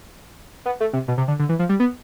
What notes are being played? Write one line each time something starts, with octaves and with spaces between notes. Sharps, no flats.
B3
A3
C3
B2
C3
D3
D3
E3
F3
G3
B3